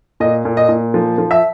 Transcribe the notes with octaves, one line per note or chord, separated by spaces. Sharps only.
A#2 D#5
A#2
D#5
A#2
F3
F3
E5